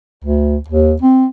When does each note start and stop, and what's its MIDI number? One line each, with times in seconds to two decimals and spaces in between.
0.25 0.57 38
0.69 0.94 39
1.02 1.26 60